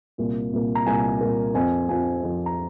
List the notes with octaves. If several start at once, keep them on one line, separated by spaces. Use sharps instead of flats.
C2 A#2 A#3
C2 A#2 A#3
A#5
C2 A#2 A#3 G#5
C2 A#2 A#3
F2 F3 C4 G#5
F2 F3 C4 G#5
F2 F3 C4
A#5